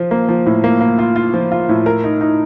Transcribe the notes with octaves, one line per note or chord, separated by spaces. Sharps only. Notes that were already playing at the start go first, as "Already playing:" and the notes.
Already playing: F3 F4
A#3
F3
A2
A#3
A#3
F4
F4
F3
F4
A2
A#4
D#4
D#4